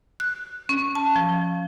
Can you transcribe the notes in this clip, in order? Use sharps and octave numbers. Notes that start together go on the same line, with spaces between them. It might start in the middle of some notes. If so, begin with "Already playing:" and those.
F#6
C#4
A5
F3